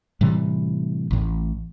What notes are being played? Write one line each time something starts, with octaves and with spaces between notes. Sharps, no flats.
A2 C3 E3 G3
A1 A2